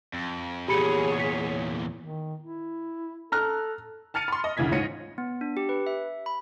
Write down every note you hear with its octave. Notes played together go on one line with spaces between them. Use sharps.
F2
E2 A#2 G4 G#4 C#5 B5 C#7
B6
D#3
E4
A4 A#5 F6 F#6
A5 F6 A6 C#7 D#7
B5 C6
D#5
D2 C#3 E3 G#6 B6
G#2 F4 C#5 A#6 C#7 D#7
B3
D4
G4
B4
E5
B5